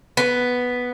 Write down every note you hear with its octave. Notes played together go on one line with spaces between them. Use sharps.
B3